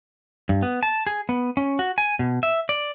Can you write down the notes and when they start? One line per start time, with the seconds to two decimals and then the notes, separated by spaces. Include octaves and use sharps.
0.49 G2
0.63 B3
0.83 A5
1.07 G#4
1.29 B3
1.57 C#4
1.79 F#4
1.98 G#5
2.19 B2
2.43 E5
2.69 D5